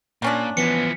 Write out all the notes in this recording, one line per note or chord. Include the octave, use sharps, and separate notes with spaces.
A#2 A#3 C#4 D4
E3 F3 B3 B6 C#7